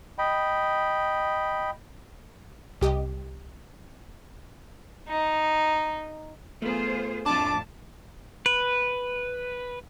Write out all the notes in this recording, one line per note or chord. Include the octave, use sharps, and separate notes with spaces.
D#5 G5 B5
C2 G4 D#5
D#4
A3 B3 F4 G#4 C5
F2 A2 D4 F4 A5 D6
B4